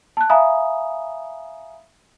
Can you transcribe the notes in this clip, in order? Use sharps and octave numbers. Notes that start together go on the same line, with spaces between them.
A5 F#6
E5 F5 G#5 A#5 B5 D#6